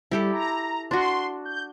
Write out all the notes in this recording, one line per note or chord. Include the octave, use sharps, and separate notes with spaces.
G3 E4 G4 A4
A#5
D4 F#4 C6
G6